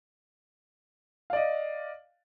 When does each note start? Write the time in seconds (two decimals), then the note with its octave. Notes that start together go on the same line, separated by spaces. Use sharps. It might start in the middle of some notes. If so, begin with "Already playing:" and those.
1.30 F5
1.33 D5
1.36 D#5